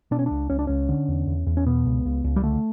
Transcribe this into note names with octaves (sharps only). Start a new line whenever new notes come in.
B2 D4
C#4
C#2 D4
C#2 C#4
D4
C#2 C#4
D3
E2
E2
E2
C#4
B2 B3
C#2
C#2
C#2
G3
D3 A3